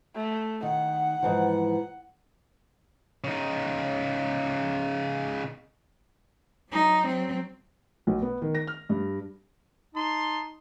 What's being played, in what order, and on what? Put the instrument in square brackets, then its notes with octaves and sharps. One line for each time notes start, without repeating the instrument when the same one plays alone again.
[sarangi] A3
[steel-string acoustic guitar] D#3 [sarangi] F#5
[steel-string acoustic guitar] G#2 E3 F3
[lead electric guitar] C#3 D#4
[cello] F#3 D#4
F#3 C4
[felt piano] B1
B3
D#3
A#6
F6
G2
[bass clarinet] D#4 [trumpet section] A5 C6